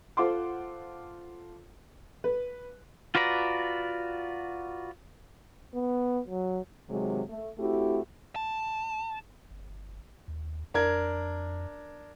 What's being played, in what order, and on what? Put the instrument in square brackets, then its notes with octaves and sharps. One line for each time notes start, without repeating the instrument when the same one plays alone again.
[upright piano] F4 A4 C5 F#5 C6 D6
B4
[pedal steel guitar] F4 F#4 B4 D5 A#5
[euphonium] B3
F#3
[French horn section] C3 D#3 F#3 G#3
A3
A3 C4 E4 F#4 G4
[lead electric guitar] A5
[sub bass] G1
D#2
[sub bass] F2 [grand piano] D4 A#4 G#6